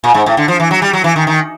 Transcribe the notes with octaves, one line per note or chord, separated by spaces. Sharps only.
A#2
G#2
A2
D3
F3
E3
F#3
G3
F#3
E3
D#3
D#3